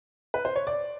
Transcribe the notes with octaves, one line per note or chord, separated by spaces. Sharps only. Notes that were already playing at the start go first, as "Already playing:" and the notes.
B4
C5
C#5
D5